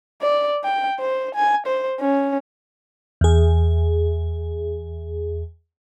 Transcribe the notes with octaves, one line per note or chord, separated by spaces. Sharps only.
D5
G5
C5
G#5
C5
C#4
E2 G#4